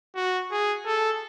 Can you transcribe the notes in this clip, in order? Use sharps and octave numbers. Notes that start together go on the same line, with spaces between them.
F#4
G#4
A4